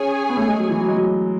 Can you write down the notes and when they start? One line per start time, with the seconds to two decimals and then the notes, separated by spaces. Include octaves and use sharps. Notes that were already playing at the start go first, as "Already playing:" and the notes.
Already playing: C#4 G#4 C#5 G#5
0.29 B3
0.37 A3
0.48 G#3
0.59 F#3
0.70 E3
0.80 F#3
0.88 G#3
0.97 F#3